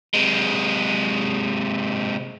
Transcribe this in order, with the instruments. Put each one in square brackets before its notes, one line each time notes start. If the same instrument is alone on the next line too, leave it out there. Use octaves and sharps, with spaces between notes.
[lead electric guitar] C3 G#3